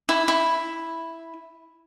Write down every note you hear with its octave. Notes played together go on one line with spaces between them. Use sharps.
E4
E4